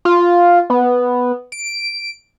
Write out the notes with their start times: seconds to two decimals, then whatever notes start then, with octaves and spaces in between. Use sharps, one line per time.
0.05 F4
0.70 B3
1.52 D7